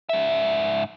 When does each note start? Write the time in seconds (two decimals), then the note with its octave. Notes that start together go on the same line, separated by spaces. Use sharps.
0.09 G#2 E5